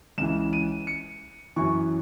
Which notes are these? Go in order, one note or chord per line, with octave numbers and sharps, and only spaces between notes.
C#2 C#3 E3 E7
D#7
C#7
F#2 E3 C#6